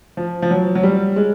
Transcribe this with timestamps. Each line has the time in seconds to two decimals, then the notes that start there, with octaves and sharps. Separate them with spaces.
0.17 F3
0.42 F3
0.51 F#3
0.75 F#3
0.83 G3
1.16 G#3